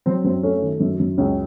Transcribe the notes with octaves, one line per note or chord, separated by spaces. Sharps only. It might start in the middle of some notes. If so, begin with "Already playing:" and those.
F#3 C4
F#2 C4
A3 C#4
D#3
F#2
F#2
C#2 C#4